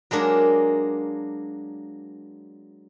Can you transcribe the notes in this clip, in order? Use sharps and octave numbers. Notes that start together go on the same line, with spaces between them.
F#3 G#3 A#3 D4